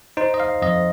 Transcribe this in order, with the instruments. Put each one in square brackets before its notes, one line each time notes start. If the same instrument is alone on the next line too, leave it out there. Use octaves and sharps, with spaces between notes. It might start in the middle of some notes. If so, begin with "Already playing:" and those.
[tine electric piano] D#4 C5
D#5
F5
F2 D#5